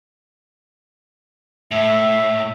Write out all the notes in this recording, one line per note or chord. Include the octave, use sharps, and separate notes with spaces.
A2 E5